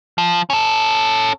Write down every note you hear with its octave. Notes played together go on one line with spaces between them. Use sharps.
F3
C#4 A4